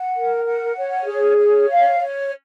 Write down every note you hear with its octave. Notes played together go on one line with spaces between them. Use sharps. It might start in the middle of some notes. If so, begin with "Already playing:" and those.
Already playing: F#5
A#4
F#5
C#5
G#4
C#5
F5
C#5